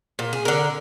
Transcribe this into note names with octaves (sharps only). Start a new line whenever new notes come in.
A#2
G#4
D3 A#4